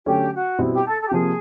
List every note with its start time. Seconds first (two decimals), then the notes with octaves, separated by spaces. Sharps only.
0.05 D3 F#3 A3 C#4 G4
0.33 F#4
0.59 B2 G3 C4 E4
0.72 G4
0.85 A4
0.99 A4
1.06 G4
1.11 C3 F3 A#3 G#4